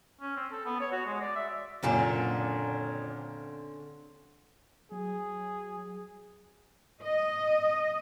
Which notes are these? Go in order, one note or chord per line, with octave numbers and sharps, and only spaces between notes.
C#4
C4
A4
B3
C#5
F#4
G#3
D5
E5
F#1 A#2 D3 C4 C#4
F#3 G#4
D#5